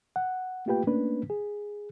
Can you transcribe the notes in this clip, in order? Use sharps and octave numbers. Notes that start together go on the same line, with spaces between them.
F#5
A3 A#3 F4 G4 B4 G5
A3 A#3 C#4 D4 B4
G#4